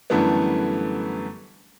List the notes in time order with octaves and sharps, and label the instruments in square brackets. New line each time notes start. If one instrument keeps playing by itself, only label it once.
[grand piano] F#2 D3 E3 G3 A3 B3